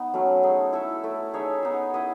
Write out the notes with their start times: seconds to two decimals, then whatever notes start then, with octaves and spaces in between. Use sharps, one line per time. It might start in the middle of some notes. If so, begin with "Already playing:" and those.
Already playing: B3 D#4
0.14 F#3 A3 C#4
0.43 A3 D#4 G#4
0.73 E4 A4 E5
1.04 A3 E4 A4
1.34 D#4 G#4 C#5 E5
1.63 B3 D#4 G#4
1.94 E4 B4 D#5